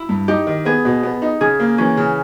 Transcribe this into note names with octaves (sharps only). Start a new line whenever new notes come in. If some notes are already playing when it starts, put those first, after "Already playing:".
Already playing: E4
G2
D#4 G4
D#3
B3 G#4
B2
B3
D#4
C#3 G#4
A#3
E3 C#4
C#3